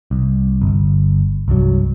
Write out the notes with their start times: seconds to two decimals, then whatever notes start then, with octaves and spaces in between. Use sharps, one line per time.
0.11 C2
0.62 G1
1.48 C2 G2 F#3